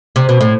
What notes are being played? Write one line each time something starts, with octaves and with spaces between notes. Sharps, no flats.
C3
B2
A2